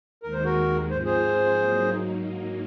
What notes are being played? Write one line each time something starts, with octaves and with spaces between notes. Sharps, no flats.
D#2 D#3 G#3 A#4
C5
F#4 A#4
G#2 F3 C4 F4 C5
G#4 C5
G#2 F#3 A#3 D#4